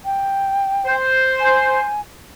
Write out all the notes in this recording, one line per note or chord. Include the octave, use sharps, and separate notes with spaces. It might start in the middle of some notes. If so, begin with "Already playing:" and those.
G5
C5
G#5